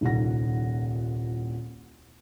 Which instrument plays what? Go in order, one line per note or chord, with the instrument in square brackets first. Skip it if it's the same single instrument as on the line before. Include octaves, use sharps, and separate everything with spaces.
[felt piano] D#1 C2 A#2 D#4 F#5 A#6